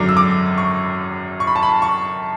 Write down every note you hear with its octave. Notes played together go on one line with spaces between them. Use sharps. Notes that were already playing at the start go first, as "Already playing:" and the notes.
Already playing: G#1 F#2 D3 F#3 D6
E6
D6
C#6
C#6
B5
A5
B5
C#6